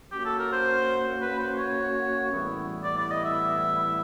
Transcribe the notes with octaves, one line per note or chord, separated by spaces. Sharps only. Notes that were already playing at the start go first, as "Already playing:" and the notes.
A#3 C#4 F#4 G4
A4
A#4
C5
B4
C5
C#5
A2 E3 G3 B3 E4
D5
D5
D#5
E5